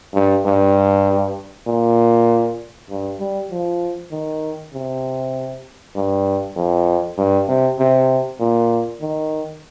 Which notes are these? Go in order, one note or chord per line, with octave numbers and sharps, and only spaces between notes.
G2
G2
A#2
G2
G3
F3
D#3
C3
G2
F2
G2
C3
C3
A#2
D#3